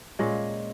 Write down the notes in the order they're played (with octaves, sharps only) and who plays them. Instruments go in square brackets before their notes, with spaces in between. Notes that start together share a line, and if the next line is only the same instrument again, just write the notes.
[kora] A#2 G#3 C#4